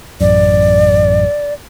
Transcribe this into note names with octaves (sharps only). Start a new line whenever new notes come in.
A1 F#2 D5